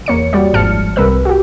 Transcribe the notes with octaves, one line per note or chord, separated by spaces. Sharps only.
E2 A#3 C#5 C#7
G3 F#4 D5
G#1 G#2 F3 A5 F6 C#7
C2 C3 G3 A#4 B4 E6
F#4 G4